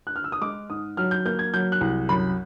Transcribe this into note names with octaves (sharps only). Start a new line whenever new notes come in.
F#6
F6
E6
D#6
G#3 D6
G#2 D#6
F#3 F6
G6
A#3 G6
G#6
F#3 G6
F#6
C2
F#2 B5